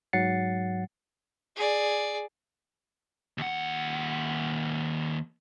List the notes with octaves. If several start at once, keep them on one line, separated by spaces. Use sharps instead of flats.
G#2 F#3 F#5 A6 C7 C#7
G#4 D5
D#2 F#5